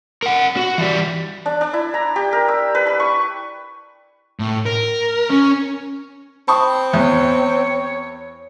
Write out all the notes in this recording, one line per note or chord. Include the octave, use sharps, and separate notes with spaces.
A#4 F#5
F#4
E3 G3
D4
D4
E4
A#5
G4
A#4
E6
B4
B5
C#6
A2
A#4
C#4
C4 A5 B5 C#6 D#6
E2 C#5